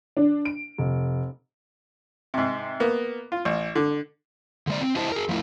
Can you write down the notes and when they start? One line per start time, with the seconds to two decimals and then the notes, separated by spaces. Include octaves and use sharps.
0.17 D4
0.45 D7
0.78 F1
2.34 G#2 C3
2.80 A#3 B3
3.32 F4
3.45 A1
3.76 D3
4.67 D3 G#3 D5
4.81 C4
4.96 E4 G4 C5 D#5 A5
5.12 G#4 A#4
5.29 F3 A3 E4 A#4